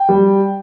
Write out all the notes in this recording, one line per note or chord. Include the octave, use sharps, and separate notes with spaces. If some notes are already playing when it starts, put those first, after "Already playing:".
Already playing: G5
G3